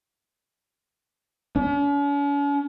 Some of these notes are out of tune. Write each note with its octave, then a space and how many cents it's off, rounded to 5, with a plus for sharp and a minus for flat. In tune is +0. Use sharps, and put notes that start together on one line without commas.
C#4 +45